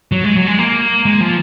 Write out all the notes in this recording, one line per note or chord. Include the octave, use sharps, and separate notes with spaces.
F#3
G#3
F#3
G#3
A#3
G#3
F3